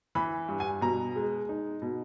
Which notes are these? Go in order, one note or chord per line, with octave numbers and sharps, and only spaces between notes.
E3 B5
G2
G#5
B2 A#5
G#3
D#4
B2